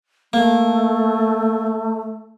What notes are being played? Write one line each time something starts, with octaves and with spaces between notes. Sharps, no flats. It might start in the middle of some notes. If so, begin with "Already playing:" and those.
A3 A#3